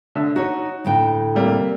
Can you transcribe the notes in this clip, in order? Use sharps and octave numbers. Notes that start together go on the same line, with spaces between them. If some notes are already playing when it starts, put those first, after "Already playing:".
D3 E5 E6
D#4 F#4 C#5
D2 A2 G5
C3 G3 A#3